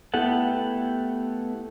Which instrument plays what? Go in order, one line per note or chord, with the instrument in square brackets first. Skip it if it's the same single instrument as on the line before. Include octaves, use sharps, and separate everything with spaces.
[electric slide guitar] A3 B3 E4 G4 A4 F#5